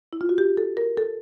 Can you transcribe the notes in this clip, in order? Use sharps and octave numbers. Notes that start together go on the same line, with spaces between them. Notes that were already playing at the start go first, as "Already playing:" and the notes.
E4
F4
F#4
G4
A4
A#4
A4